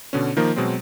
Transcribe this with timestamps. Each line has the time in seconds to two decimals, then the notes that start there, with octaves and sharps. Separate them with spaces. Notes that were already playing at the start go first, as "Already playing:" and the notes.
0.13 B2 D3 C#4
0.37 D#3 F3 A#3 D#4
0.56 B2 F#3 G#3 C4